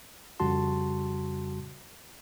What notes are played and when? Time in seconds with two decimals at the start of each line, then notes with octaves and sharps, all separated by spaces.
0.40 F2 C#3 G3 F#4 A5 C6